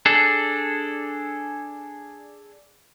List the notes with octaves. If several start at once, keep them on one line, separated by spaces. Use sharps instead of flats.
D4 G#4 A4